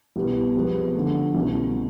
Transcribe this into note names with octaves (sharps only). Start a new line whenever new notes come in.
C2 B2 G3 B3
C3 F3 G#3 B3
D3 F3 A3
C2 B2 F#3 A3 C#4